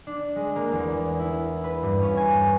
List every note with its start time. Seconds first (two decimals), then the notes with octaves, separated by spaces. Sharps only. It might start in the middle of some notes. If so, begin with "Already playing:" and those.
0.07 D4
0.36 G#3
0.56 A#3
0.72 E2
1.19 E4
1.64 B4
1.83 G2
2.02 C#4
2.17 G#5